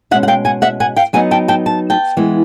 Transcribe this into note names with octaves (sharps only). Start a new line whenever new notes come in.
B2 G#3 C#4 E5 F#5
F#5
F5 G5
F#5 G#5
E5 F#5
F#5 G#5
F5 G5
F#3 B3 D#4 F#5 G#5
G5 A5
G5 A5
A5
G5 A5
E3 G#3 B3